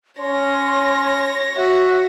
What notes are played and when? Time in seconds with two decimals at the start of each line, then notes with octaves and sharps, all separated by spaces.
0.19 C#4 C#5 C6 A#6
1.56 F#4 E5